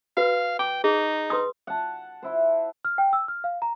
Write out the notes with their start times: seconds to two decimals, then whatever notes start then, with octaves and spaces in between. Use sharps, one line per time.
0.17 F#4 B4 F5
0.59 G5 D6
0.84 D#4 G#4
1.30 B4 C6 D#6
1.67 F#5 A5
2.23 E4 C5
2.85 F6
2.98 G5
3.13 E6
3.28 F6
3.44 F5
3.62 A#5